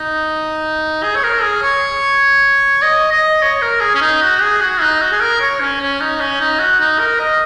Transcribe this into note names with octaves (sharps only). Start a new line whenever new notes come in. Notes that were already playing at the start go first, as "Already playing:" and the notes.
Already playing: D#4
G#4
C#5
A#4
G#4
C#5
D#5
D#5
C#5
A#4
G#4
C#4
D#4
F#4
G#4
F#4
D#4
F#4
G#4
A#4
C#5
C#4
C#4
D#4
C#4
D#4
F#4
D#4
A#4
D#5